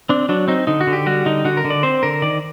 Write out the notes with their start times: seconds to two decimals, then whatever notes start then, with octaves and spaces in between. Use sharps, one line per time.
0.09 C4 D4
0.29 F#3 D4
0.48 C4 D#4
0.67 D3 D#4
0.81 F#4
0.87 D3
0.93 G4
1.06 G3 F#4
1.26 D3 D#4
1.45 D3 F#4
1.57 A#4
1.65 D3
1.70 D5
1.83 C4 C5
2.03 D3 A#4
2.22 D#3 D5